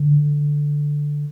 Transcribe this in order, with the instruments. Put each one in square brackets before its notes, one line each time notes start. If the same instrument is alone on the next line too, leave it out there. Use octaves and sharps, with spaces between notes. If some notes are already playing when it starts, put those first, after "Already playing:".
Already playing: [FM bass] D3